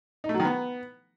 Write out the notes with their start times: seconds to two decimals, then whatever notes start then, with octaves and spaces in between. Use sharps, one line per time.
0.24 D#4
0.29 A3
0.34 F#3
0.40 D#3
0.45 B3